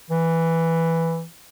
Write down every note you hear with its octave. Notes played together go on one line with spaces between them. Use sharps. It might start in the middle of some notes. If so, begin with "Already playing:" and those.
E3